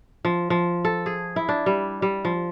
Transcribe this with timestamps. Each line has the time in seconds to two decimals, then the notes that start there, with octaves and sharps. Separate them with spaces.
0.25 F3
0.50 F3
0.85 A4
1.06 G#4
1.36 E4
1.49 D4
1.66 G3
2.02 G3
2.25 F3